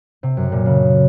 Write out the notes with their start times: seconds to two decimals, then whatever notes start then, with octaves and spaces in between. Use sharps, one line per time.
0.23 C3
0.37 F#2
0.52 A#2
0.66 C#3